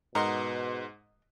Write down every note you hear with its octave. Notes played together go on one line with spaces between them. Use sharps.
G#2 B2 A#4 D#5 F#5 C6